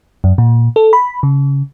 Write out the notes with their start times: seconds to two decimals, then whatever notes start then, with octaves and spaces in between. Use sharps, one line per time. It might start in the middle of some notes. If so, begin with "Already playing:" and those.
0.24 F#2
0.38 A#2
0.76 A4
0.93 B5
1.23 C#3